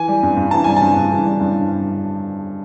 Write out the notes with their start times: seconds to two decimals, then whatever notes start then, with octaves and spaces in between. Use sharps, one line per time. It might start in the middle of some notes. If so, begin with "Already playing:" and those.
Already playing: E3 G#5
0.08 G3
0.23 G2
0.37 G2
0.51 E3 A5
0.64 G3 G#5
0.77 A5
0.82 G2
0.96 G2
1.11 E3
1.25 G3
1.40 G2